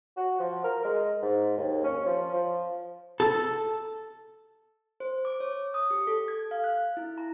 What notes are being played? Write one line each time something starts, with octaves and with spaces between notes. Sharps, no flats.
F#4
F3
A#4
G#3
G#2
D#2
C#4
F3
F3
A4
C5
D6
C#5
D#6
G4
A4
G#6
F5
F#6
E4
A#5